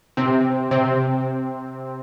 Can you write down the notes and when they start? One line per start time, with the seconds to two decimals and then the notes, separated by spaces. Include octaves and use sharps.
0.17 C3 C4
0.71 C3 C4